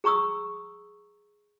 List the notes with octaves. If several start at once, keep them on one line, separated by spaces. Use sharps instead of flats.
G#4 A#5 C#6 D#6 E6